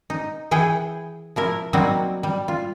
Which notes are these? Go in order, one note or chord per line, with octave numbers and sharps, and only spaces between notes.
D#4
E3 G#4 F#5 G5
F3 E4 A#4
F#3 G3 A#3 C4 D#4 F#4
G3
F4